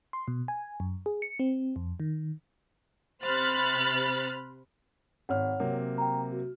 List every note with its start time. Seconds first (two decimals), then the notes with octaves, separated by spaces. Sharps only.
0.13 C6
0.28 B2
0.48 G#5
0.80 F#2
1.06 G#4
1.22 C#7
1.39 C4
1.76 F2
2.00 D#3
3.24 C3 C5 B5 F6 F#6 A6
5.29 G#1 C#5 F#5 F6
5.60 C3 F#3 A#3
5.98 G5 A#5
6.32 F#4